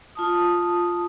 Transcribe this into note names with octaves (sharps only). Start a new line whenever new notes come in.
F4 A5 D#6